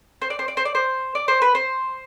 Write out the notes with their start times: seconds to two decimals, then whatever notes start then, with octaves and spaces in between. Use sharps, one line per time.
0.22 C5
0.30 D5
0.39 C5
0.48 D5
0.57 C5
0.65 D5
0.75 C5
1.15 D5
1.28 C5
1.42 B4
1.55 C5